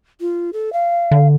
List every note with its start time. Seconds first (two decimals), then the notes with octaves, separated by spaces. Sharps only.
0.20 F4
0.53 A4
0.73 F5
1.11 D3